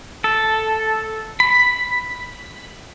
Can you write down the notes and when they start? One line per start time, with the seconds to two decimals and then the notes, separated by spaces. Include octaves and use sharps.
0.24 A4
1.40 B5